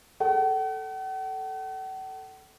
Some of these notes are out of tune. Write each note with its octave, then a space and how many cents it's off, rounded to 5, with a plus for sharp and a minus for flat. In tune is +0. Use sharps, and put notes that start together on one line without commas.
A4 +0 F#5 +45